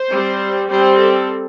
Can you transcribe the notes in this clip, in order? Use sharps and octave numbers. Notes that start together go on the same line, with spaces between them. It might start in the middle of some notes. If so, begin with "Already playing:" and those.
Already playing: C5
G3 C4
G3 C4 C5
A4